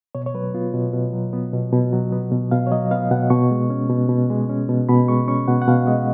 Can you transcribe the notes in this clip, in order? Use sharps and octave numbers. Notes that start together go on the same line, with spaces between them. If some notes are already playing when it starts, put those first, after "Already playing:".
B2 C#5
C#5
F#3 B4
B3 F4
B2
B2
F#3
B3
B2
B2
F#3
B3
B2
B2 F5
C#5
F#3 D#5
B3 F5
B2 F#5
B2 C#6
G#3
C#4
B2
B2
G#3
C#4
B2
B2 B5
G#3 C#6
C#4 C#6
B2 F#5
F#5
B2 F5
G#3 D#5